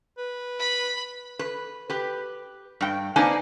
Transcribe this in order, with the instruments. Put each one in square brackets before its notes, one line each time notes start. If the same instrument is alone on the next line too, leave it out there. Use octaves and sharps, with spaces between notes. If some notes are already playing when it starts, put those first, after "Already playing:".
[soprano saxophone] B4
[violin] B5
[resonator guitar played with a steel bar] B4
G4 B4
G2 G5
A#3 C4 D4 D#4 B4 G#5